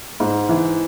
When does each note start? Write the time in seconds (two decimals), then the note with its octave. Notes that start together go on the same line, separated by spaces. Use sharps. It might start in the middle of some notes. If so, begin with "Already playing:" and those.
0.20 G#2
0.49 E3